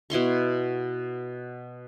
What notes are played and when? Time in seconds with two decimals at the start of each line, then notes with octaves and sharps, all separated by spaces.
0.10 B2 E4 C6 C#6